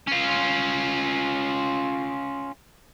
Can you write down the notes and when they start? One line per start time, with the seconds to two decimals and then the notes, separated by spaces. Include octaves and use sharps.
0.07 C#4 F4